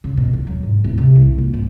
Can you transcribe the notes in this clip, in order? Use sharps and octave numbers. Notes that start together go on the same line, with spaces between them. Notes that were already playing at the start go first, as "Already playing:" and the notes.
C#3
B2
D#2
F#3
G#2
D1
C3
C2
A#1
G#2